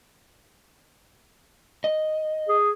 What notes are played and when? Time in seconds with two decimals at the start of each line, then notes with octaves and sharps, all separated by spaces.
1.84 D#5
2.49 G#4